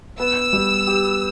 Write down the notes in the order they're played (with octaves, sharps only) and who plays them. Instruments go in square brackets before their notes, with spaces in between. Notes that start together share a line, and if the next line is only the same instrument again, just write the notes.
[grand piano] B3 [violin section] E6
[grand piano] G3
G4